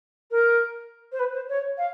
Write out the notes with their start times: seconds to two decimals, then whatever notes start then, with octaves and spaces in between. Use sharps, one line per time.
0.31 A#4
1.12 C5
1.19 B4
1.34 C5
1.49 C#5
1.78 F5